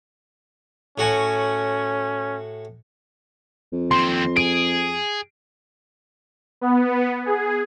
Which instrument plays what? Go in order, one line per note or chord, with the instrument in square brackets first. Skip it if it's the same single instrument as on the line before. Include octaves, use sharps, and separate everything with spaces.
[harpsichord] A2 F#4 G#5 [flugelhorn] C#4
[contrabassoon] F2
[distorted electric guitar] D#2 C4 [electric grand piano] C6
[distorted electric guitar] G#4 [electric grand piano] D7
[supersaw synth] B3
G#4